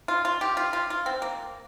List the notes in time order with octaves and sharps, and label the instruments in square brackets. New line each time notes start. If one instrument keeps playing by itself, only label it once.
[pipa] F4
F4
G4
F4
F4
F4
C4
A#3